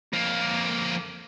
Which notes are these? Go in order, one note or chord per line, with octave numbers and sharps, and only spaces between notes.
F2 A#3